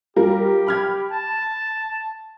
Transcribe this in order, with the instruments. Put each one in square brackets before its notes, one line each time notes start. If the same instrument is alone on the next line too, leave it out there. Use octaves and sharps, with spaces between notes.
[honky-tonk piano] G3 F4 A#4 [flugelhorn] G4
[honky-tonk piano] B5 F6 G#6
[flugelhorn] A5